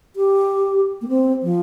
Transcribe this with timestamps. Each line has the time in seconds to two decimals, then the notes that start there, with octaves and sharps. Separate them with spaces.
0.16 G4
1.01 A#3
1.08 C4
1.43 F3